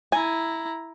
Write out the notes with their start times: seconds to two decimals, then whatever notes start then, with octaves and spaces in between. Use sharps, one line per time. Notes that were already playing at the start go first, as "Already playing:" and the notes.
0.12 E4 G#5 A#5